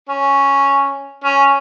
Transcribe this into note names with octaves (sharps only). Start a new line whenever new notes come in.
C#4
C#4